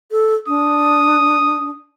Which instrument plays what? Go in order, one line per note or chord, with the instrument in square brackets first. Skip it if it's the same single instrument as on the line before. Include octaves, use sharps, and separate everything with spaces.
[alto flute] A4
[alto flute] D4 [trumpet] D#6